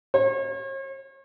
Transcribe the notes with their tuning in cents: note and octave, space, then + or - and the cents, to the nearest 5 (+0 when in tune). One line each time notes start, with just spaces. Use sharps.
C#5 -45